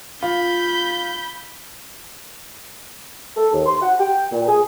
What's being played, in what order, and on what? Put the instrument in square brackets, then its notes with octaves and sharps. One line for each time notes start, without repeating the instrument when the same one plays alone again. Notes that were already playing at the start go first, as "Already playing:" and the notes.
[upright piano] F4 [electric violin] B5 G6
[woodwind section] A4
D#2
C6
F#5
G5
A#2
G#4